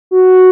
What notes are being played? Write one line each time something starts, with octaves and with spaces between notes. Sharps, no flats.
F#4